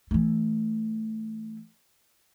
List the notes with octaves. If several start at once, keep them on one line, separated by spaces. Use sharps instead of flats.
E3 A3